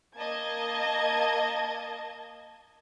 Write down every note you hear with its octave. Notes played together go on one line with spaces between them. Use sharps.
A#3 D#5 A5 G#6